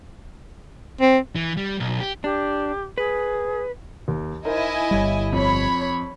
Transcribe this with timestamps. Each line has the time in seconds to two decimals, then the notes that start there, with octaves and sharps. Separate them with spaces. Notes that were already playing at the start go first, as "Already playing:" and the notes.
1.01 C4
1.35 E3
1.57 G3
1.80 B1
2.00 G4
2.24 D4 G4
2.98 G#4 B4
4.08 D#2
4.45 D#4 E4 A#4 C5 D#5 G#5
4.91 G1 G3 C#5
5.33 F2 C#5 B5